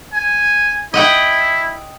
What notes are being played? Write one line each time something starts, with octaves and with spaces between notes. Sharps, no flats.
G#5
E4 D#5 F#5 G5